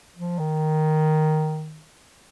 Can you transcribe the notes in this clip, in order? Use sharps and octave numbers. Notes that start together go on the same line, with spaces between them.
F3
D#3